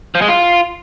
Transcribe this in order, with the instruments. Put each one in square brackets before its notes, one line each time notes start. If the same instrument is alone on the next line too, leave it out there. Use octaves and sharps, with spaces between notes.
[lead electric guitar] F3
G#3
F4